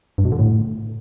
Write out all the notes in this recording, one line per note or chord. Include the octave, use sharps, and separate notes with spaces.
G2
B2
D3
A2